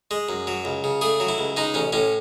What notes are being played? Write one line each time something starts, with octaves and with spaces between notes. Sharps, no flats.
G#3
F#2
F#3
C#2
C#3
A3 G#4
F#3
E4
C#2
G#3 D#4
A1 C#4
A2 C#4